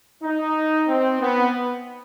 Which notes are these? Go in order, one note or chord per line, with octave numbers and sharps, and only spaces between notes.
D#4
C4
B3